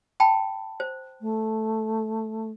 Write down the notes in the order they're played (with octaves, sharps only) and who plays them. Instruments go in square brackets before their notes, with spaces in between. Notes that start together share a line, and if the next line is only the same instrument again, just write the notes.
[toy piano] G5 A5 B5
C5
[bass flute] A3